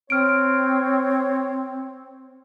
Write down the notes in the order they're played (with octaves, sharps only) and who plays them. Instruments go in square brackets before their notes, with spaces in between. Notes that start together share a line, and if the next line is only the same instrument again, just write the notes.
[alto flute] C4 [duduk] C#5 [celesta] F6 D7